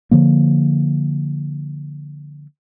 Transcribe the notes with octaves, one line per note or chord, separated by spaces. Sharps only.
D3 F3 A#3